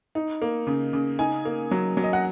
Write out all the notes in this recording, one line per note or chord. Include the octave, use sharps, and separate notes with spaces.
D#4
A#3
C#3
C#3
D#4 G#5
A#3
F#3
F#3
D#5
F#5